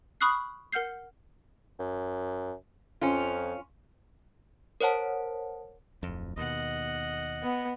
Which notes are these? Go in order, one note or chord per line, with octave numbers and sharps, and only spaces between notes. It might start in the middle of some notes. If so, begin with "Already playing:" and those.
B5 C#6 D#6 F6 F#6 C7
A#4 F#5 F6 G6 C7
F#2
F2 C#4 F4
A#4 C5 C#5 F#5 A5
D1 F2
D#2 B2 D#5 F#5
B3